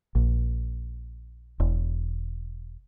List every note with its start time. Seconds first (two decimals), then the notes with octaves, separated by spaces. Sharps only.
0.15 A#1
1.60 E1